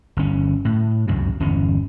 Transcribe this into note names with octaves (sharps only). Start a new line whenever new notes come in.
G1 C#4
A2
C#2 F#2 C3
G1 E2 C#4